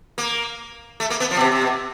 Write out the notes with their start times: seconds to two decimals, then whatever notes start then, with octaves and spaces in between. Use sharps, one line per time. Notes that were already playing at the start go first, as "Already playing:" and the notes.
0.18 A#3
1.00 A3
1.10 A#3
1.20 B3
1.31 F3
1.37 B2
1.41 C3
1.52 C3
1.61 B2